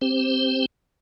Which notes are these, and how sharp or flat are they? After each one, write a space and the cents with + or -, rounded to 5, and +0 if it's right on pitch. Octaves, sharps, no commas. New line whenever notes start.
C4 +5 G4 +0 C5 +0